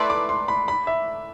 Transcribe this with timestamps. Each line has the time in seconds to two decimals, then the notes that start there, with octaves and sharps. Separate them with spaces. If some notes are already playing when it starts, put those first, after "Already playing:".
Already playing: A3 E4 B4 D5 C6
0.10 D6
0.29 C6
0.48 B5
0.68 B5
0.87 E5